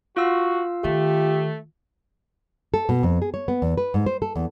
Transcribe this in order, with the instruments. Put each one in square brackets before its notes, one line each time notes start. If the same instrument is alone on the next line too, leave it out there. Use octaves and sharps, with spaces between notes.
[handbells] F4 F5 E6 [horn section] F#4
[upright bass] D#3 [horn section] A3 [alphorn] G4
[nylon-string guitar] A4
B2
F2
G#4
C#5
B3
E2
B4
G#2
C5
A4
E2